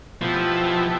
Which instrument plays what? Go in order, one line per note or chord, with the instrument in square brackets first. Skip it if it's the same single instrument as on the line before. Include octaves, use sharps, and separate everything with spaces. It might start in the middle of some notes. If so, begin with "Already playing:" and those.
[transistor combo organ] B2 A3 E4 G4 [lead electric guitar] F3